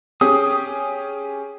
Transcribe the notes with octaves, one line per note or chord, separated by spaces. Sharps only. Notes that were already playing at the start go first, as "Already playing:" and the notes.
C#4 G4 G#4 D#6